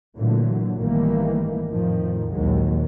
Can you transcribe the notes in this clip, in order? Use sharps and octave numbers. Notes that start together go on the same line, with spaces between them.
A#2 D3 E3 F#3 A3
G#1 D#3 E3 G3 A3 A#3
F2 A2 D#3 F3
A#1 D#2 D#3 F#3 G#3